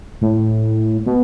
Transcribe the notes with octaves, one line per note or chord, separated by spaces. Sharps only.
A2
B2